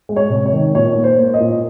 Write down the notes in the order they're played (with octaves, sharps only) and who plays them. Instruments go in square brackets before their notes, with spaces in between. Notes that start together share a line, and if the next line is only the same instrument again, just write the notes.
[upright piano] G#3
C#5
C3
C#5
D#3
A#2 C#5
A#3
C5
A#3
D#5
A#2